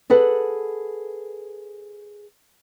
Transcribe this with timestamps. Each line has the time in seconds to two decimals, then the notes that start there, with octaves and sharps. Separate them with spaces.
0.10 G#4 A4 B4 F#5